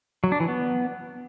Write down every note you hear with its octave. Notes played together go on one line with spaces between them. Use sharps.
F#3
D4
E3
B3